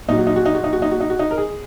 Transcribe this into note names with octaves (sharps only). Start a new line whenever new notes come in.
A#2 F#3 D#4
F#4
D#4
F#4
D#4
F#4
D#4
F#4
D#4
F#4
D#4
F#4
D#4
A#4
G#4